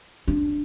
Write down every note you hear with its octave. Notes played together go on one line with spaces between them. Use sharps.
D4